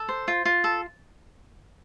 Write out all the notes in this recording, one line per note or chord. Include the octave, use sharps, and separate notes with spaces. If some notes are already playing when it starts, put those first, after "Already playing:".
Already playing: A4
C5
F4
F4
A4